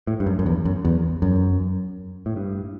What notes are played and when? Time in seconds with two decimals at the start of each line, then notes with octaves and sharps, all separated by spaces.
0.07 A2
0.20 G2
0.26 F#2
0.39 F#2
0.46 E2
0.65 F#2
0.85 E2
1.22 F#2
2.26 A2
2.36 G2